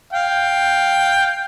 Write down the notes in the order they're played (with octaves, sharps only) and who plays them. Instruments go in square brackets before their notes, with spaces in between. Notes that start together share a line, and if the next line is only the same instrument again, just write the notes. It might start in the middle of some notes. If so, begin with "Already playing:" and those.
[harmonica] F5 G5